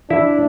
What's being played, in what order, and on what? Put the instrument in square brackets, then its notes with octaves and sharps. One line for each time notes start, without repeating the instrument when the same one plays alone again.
[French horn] D4 [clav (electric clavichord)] E4